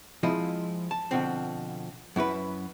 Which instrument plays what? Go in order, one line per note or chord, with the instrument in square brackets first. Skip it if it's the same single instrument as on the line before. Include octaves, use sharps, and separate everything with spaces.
[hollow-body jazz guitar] F3 G#3 C4 E4 F4 D#5
A5
B2 D3 F3 C4
F#2 E4 F#4 B4